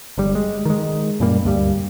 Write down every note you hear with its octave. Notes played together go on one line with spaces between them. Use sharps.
G1 G3
G#3
D#3 G#3
F#2 A#2 G3 A#3
D2 G2 G3